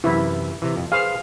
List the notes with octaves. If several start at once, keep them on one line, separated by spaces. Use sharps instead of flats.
F#2 C3 E3 E4
C3 E3
F2
G#4 B4 C5 F5